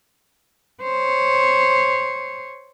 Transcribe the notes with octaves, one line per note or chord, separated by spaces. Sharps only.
C5 C#5